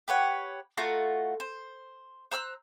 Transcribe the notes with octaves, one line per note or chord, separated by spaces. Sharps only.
G4 B4 C#5 F#5
A3 F4 F#4 A#5
C5
C5 A#5 E6 F#6